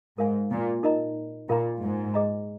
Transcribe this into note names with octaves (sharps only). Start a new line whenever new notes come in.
G#2 A#4 F5 G#5
A#2
D#4 A#4 D#5 A#5
A#2 F4 A#4 F5 A#5
G#2
G#4 D#5 A#5